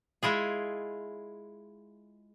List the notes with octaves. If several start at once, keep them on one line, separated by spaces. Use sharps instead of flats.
G#3 E4 F4 G#4